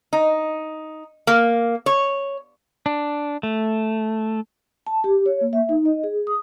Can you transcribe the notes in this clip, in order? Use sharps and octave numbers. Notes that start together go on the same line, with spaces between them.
D#4
A#3
C#5
D4
A3
A5
G4
C#5
A#3
E5
D#4
D#5
G#4
D#6